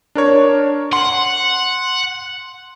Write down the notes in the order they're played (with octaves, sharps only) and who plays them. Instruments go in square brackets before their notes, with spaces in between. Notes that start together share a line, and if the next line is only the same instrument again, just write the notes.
[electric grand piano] D4 A#4 C#5
[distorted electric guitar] F#5 [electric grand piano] C6